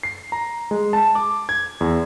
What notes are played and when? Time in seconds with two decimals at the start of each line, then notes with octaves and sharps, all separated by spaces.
0.03 C7
0.32 A#5
0.71 G#3
0.93 A5
1.15 D6
1.49 G#6
1.81 E2